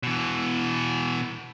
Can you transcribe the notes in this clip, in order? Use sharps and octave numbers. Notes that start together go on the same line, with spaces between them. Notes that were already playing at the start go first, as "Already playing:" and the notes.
B2 E3